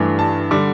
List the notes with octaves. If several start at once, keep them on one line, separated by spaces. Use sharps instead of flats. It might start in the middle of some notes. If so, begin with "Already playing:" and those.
Already playing: G2 E3 A3
A5
D3 G3 D4 D6